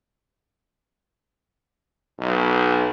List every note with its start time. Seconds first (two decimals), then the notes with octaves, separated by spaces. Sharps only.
2.19 B1